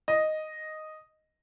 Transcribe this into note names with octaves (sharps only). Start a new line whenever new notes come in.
D#5